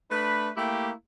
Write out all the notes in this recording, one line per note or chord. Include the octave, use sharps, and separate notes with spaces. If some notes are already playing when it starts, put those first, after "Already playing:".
A3 D4 B4
A3 A#3 E4 G4